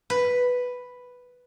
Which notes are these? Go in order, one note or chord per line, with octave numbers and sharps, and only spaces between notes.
B4